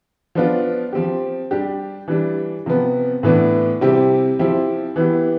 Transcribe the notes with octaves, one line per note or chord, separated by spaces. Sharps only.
F3 B3 D4 F4
F3 C4 G4
G3 D4 G4
E3 G3 D4
C3 F3 B3
A2 E3 B3 D4
C3 G3 C4 E4 G4
F3 C4 E4 G4
E3 B3 E4 G4